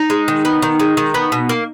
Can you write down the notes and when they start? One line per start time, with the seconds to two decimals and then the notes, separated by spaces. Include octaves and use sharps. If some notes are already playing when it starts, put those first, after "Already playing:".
Already playing: D#4
0.10 G#3
0.28 D#3
0.45 B3
0.62 D#3
0.80 G#3
0.97 D#3
1.14 B3
1.32 B2
1.49 A#3